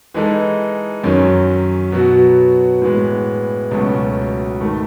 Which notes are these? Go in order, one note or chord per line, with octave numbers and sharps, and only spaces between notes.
E3 G#3 D#4 A4
F#2 D#3 F#3 C#4
B2 F#3 B3 F#4
A2 E3 G#3 B3
C#2 B2 F#3 A3 C#4
G#2 D#3 A3